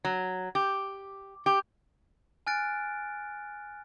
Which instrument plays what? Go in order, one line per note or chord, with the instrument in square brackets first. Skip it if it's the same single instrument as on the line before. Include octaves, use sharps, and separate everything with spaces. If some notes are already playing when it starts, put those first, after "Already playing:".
[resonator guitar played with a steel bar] F#3
G4
G4
[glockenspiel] G#5 F6 F#6 A6 D7